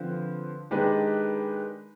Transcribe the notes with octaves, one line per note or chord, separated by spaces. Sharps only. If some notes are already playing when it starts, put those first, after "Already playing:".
Already playing: D3 F3 C4 F4 B4
D#3 G#3 D4 G4 B4